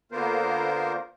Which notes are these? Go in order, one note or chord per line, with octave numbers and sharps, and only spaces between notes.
D3 A#3 B3 F4 A#4 C5